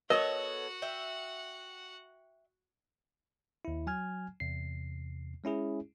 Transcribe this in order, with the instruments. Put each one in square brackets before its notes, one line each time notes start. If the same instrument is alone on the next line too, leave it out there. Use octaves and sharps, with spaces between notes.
[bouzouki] B3 A4 C#5 [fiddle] F#4 F#5 [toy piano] A#4 [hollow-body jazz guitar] D#5
[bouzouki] E5 G5
[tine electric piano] D#2 E4
F#3 G#5 F6 G#6
E2 C3 C7
G#3 C#4 E4 G#4